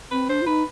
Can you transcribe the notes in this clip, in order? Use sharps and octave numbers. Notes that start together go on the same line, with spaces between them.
C4 B4
D4 C5
F4
D#4 B4